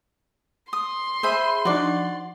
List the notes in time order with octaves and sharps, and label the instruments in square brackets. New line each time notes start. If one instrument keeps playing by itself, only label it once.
[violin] C6 [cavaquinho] D#6
[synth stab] G#4 D#7 [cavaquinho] C5 E5 B5
[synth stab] F3 D4 D#4 [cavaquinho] F#4 D5